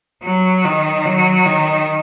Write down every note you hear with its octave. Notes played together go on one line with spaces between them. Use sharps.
F#3
D#3
F#3
D#3